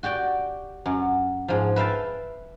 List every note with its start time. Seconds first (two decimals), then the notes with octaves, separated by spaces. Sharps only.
0.03 F#4 G4 D5 G5
0.86 F#2
1.48 G#2 F3
1.76 B4 E5 F5 G5 A5